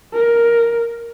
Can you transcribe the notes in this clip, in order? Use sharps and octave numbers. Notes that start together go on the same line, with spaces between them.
A#4